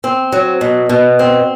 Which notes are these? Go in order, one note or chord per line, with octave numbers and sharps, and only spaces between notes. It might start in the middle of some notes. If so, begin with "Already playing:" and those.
C4
F#3
B2
B2
C4